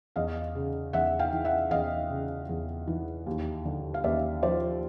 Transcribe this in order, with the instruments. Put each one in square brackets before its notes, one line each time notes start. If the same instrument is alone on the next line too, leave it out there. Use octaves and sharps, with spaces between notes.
[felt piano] E2 D#5 F5
C#3
E2 E5 F#5
F5 G5
E3
E5 F#5
E2 D#5 F5
C#3
E2
E3
D#2
D3
F5
D#2 D5 E5
F3 C5 D5